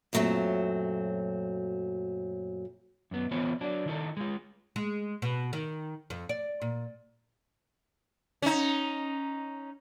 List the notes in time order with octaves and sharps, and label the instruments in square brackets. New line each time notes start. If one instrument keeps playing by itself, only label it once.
[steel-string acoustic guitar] F#2 A#2 F#3 A3 C4
[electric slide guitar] F#2 B3
E3 B3 C4 F4 C#5
F#3 D4
D#3 E4 A4
G#3 F4
[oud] G#3
B2
D#3
F2
D5
A#2
[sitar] C#4 D#4